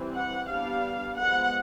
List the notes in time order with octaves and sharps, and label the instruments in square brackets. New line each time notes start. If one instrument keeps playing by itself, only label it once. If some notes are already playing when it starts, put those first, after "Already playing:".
Already playing: [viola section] E3 G3 C4
F#5
G3 B3 D4 F5
F3 G#3 B3 F#5